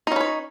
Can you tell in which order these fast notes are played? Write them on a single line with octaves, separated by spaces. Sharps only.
D#4 C#4 B4 C#5